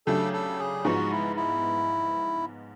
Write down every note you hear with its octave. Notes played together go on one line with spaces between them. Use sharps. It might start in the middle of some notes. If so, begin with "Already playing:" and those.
C#3 F#3 A3 D4 G4 A4
A4
G#4
G#2 F3 G#3 B3 D#4 F#4
E4
E4